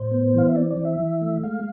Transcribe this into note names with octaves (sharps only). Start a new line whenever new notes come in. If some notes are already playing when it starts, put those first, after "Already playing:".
Already playing: A2 C5
B3
E3 F5
E5
C4 D5
D5
E3
E5
E3
A3
G#3 F5